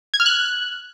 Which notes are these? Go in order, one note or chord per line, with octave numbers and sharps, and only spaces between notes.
G#6
F6
F#6